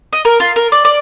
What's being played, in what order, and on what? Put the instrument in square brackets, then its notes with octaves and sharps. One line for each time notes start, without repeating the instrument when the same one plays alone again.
[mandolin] D#5
A#4
F4
A#4
D5
D5